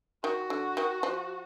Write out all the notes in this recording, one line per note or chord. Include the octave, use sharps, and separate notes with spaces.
D#3 F#4
D3
D#3
F3